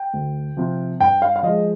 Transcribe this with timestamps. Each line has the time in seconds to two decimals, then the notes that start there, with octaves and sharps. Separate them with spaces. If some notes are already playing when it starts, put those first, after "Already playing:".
Already playing: G5
0.13 D2
0.57 C3 F3
1.00 G2 G5
1.22 F5
1.36 F5
1.43 F3 G#3 D#5